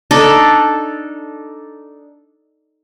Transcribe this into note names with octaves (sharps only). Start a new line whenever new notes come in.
D4 D#4 A4